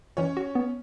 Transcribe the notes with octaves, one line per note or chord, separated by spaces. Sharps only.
E3 C#4 C#5
F#4
B3